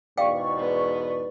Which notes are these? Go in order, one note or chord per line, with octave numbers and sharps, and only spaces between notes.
E2 G#2 B2 D5 F5 G5 C#6
B3